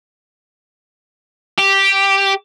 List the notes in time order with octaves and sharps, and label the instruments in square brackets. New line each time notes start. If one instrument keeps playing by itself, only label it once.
[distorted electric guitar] G4